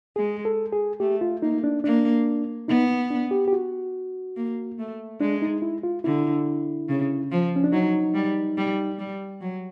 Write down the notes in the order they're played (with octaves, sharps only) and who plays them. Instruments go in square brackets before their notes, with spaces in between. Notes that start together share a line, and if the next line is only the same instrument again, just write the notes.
[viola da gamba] G#3 [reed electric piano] G#4
[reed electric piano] A4
G#4
[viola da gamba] A3 [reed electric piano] G4
[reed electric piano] F4
[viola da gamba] A#3 [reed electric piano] D#4
[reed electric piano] D4
[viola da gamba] A#3 [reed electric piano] D4
[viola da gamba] B3 [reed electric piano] D#4
[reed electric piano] D4
G4
G4
F#4
[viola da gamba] A#3
A3
[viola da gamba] G#3 [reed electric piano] D4
[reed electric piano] D#4
E4
F4
[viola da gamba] D3 [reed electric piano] E4
[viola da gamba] C#3
F3
[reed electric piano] C#4
D4
[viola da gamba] F#3 [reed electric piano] D#4
[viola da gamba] G3
G3
G3
F#3